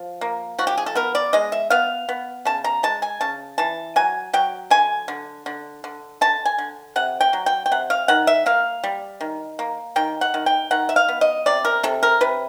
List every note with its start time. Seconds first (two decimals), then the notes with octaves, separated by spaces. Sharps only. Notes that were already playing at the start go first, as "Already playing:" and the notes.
Already playing: F3
0.21 A#3
0.58 F3 F#4
0.67 G4
0.78 G#4
0.86 A4
0.95 B3 A#4
1.15 D5
1.33 G#3 D#5
1.52 E5
1.70 B3 F5
2.09 B3
2.45 C#3 A5
2.64 A#5
2.83 G#3 A5
3.02 G#5
3.21 C#3 A5
3.58 E3 A5
3.96 F#3 G#5
4.33 F#3 G5
4.70 D3 G#5
5.08 D3
5.46 D3
5.84 D3
6.21 D3 A5
6.45 G#5
6.58 D3
6.96 C3 F#5
7.21 G5
7.33 F#3
7.46 G5
7.66 G5
7.72 C3 F#5
7.90 F5
8.08 D#3 F#5
8.27 E5
8.46 A#3 F5
8.84 G3
9.21 D#3
9.59 A#3
9.96 D#3 G5
10.21 F#5
10.34 D#3
10.46 G5
10.71 D#3 F#5
10.89 E5
10.96 F5
11.08 B3
11.21 D#5
11.46 C3 D5
11.65 A#4
11.83 C3 A4
12.03 A#4
12.21 C3 B4